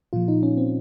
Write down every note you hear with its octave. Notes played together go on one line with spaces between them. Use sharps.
A#2 F3 F4
D#4
C#4
C4